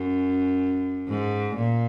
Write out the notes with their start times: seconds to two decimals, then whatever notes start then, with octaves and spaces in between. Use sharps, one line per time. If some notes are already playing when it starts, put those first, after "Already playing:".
Already playing: F#2
1.08 G#2
1.56 A#2